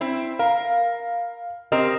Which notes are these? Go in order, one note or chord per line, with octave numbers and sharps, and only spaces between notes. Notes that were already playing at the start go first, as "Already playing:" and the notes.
C4 E4
A#4 F5
C4 G4 A#4 D#5